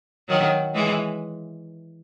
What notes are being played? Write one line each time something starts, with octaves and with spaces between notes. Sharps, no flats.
D#3 F#3
E3 G#3